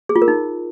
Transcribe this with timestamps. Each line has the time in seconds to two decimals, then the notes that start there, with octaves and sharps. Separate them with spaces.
0.09 G#4
0.16 F4
0.22 A#4
0.28 D#4